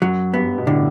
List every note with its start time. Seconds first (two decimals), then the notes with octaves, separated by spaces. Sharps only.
0.02 F#2 F#3
0.34 G2 B3
0.58 B2
0.67 A2 D3